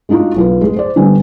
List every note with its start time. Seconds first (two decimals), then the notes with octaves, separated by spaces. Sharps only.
0.09 G#3 D4 D#4 F4 F#4
0.36 B1 F4 B4
0.61 G#3 G#4
0.77 C5 D5
0.96 D3 G3 B3 G#5